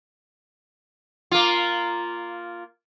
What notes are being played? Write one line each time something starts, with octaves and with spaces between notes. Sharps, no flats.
A#3 F4